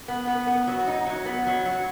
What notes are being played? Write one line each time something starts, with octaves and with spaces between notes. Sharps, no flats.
B3
B3
B3
F#3
D#4
F#3
B3
F#3
F#3